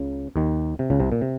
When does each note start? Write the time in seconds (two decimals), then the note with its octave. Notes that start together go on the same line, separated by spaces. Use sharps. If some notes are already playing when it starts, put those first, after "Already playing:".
Already playing: C#2 C#3
0.36 D#2 D#3
0.79 C3
0.90 C#2 C#3
1.00 C2 C3
1.12 A#2
1.21 C3